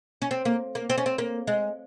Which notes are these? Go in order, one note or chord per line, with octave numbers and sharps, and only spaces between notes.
C#4
C4
A#3
A#3
C4
C#4
C4
A#3
G#3